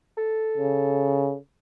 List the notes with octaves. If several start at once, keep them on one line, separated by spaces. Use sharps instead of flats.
A4
C#3